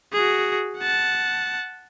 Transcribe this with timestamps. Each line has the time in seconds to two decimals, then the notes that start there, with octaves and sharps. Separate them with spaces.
0.12 F#4 G#4
0.78 F#5 A5